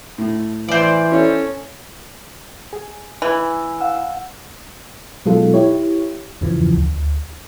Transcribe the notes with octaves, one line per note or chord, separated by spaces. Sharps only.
A2
E3 C5 D5
C#4 E4 A4
G#4
E3 G#5
F5 F#5 E6
B2 F#3 G#3 D#4 F4 A4
E4 G4 C#5
E2 G2 C#3 E3 F3
D2